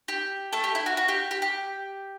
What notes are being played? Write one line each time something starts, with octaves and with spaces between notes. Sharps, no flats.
G4
A3 A4
G4
E4
F#4
F#4
G4
G4
G4